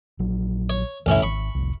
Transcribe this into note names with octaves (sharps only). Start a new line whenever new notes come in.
A#1 F#3
C#5
A1 D2 G2 B2 C#4 E4
G#1 B5 C#6
F1 C2